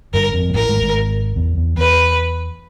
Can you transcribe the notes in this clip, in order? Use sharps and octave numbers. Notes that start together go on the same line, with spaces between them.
G1 G2 A#4
F2
A#2
A1 A2 A#4
G#1 G#2
G#1 G#2
E2
E2
E2 B4